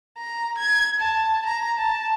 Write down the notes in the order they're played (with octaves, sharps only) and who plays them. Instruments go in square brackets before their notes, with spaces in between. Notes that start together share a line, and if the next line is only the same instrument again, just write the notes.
[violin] A#5
G#6
A5
A#5
A5